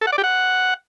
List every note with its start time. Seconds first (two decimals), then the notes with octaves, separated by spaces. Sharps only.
0.01 A4
0.07 F#5
0.12 D5
0.18 G4
0.24 F#5